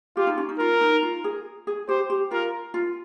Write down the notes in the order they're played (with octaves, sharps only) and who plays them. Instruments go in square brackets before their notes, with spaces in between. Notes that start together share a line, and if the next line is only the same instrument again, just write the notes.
[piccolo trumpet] F4 [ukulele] G4
[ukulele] D#4
C#4
D#4
[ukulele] F4 [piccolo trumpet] A#4
[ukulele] D#4
F4
G#4
G#4
[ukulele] G4 [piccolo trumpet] C5
[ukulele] G4
[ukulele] F4 [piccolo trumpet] A#4
[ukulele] F4